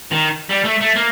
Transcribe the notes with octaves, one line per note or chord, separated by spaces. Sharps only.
D#3
G3
A3
A3
A#3